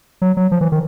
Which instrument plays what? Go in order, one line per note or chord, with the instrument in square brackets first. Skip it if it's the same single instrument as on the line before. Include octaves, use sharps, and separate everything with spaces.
[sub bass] F#3
F#3
F3
E3
D#3